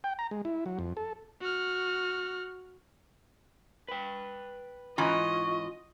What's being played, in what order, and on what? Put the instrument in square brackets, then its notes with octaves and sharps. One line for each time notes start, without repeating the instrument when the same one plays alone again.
[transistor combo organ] G5
A#5
G#3
E4
F#3
F2
A4
[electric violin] F#4 F6
[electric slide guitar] B4 G5
[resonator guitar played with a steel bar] G#2 E3 C#4 [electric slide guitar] F4 [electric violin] D#5 [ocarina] C#6